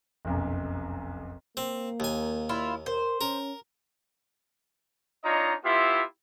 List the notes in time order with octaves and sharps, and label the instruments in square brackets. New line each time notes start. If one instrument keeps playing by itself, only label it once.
[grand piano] F1 B1 F#2
[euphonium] A#3 [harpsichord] C4
[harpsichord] D#2 G#5
[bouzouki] E4 F4
[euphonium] A#4 [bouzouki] C5
[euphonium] C#4 [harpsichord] A#4
[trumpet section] D4 D#4 F4 C#5 D#5 A#5
B3 E4 F4 G4 E5 C6